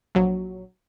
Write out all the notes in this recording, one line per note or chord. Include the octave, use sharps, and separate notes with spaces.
A#1 F#3